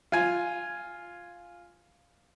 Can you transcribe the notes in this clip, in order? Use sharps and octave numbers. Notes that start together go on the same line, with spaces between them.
F4 G#5